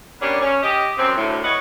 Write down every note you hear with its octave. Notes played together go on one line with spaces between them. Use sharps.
G3 A#3 B3 C#4 D4 G4
C#4
G4 D#5
F#2 C4
D2 A2
E4 F#4 B4 C#5 D#5 F#5